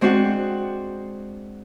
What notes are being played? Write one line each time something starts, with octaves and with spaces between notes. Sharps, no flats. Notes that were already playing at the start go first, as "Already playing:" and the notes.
G#3 C4 D4 F#4 C5 F#5